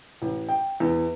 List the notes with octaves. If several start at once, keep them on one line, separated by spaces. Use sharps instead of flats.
A1
G5
E2